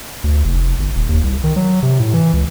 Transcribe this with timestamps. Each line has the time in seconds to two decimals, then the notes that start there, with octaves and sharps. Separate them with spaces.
0.24 D2
0.44 F1
0.79 G1
0.95 D#1
1.09 D#2
1.23 C2
1.44 D#3
1.56 F#3
1.83 C3
1.99 A2
2.14 E3
2.33 C#2